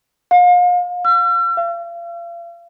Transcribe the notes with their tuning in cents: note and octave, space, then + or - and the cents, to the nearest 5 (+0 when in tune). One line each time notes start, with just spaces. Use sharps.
F5 +40
E6 +45
F5 -35